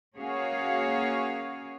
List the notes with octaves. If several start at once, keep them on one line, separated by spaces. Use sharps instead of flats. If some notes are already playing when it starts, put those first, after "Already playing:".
A#3 C#4 F#4 G#4 C#5 F5